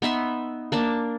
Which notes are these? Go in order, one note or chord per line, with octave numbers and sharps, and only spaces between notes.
B3 D#4 E5 C6
A#3 D4 A5